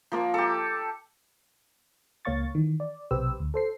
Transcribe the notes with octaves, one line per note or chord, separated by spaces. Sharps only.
F3 A#3
G4 A4
C#2 A#3 C#5 F5 C#6 A6
D#3 E3
D5
B1 C3 G4 B4 C5 E6
D2
A4 C5 C7